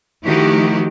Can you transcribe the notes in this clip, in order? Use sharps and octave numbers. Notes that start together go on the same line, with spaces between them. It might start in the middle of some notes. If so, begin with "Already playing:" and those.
D#3 F3 A3 E4 F#4 G4